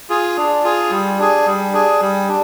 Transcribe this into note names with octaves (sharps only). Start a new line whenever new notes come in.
F4 G#4
D4
F4 G#4
G3
D4 G#4
G3
D4 G#4
G3
D4